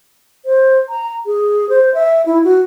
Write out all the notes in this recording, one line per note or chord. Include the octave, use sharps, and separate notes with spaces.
C5
A#5
G#4
C5
E5
E4
F#4